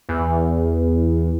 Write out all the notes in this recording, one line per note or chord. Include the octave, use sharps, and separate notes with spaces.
E2